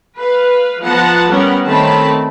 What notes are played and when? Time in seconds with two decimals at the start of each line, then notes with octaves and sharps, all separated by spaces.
0.20 B4 F5
0.82 F3 B3 F#5 A5 A#5
1.31 G3 B3 C#4 A#4 F#5
1.66 D#3 A3 C4 C#5 A5 B5